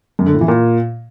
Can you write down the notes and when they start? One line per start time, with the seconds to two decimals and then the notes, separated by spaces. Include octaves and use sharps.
0.19 F#2
0.26 D3
0.34 A2
0.41 E3
0.48 A#2